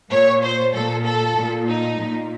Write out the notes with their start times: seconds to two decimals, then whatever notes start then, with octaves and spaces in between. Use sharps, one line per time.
0.10 A#2 C#5
0.43 C5
0.74 A#2 A4
1.05 A4
1.36 A#2
1.68 D#4
1.99 A#2